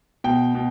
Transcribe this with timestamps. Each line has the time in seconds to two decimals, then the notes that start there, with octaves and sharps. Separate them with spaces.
0.24 B2 G5
0.55 B2